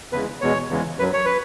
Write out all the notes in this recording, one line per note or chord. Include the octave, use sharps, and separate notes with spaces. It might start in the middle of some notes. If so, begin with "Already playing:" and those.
E2 C#3 E3 G#3 B4
E2 B2 G#3 C#5
E2 C#3 E3 G#3
F#2 F#3 B4
C#5
B4